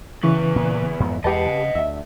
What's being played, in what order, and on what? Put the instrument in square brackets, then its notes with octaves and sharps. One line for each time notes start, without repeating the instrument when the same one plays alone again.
[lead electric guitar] E2 B4 [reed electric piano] C#3 E3 C#6
[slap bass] A#2
F2 G#2 B3
[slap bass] E2 G#3 [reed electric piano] G4 B4 A5 [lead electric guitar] D#5 F#5
[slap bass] C#3
[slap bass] D2 [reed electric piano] E5